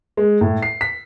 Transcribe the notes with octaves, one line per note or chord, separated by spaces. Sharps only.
G#3
A2
C7
B6